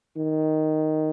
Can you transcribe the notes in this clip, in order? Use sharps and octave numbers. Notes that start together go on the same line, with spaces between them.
D#3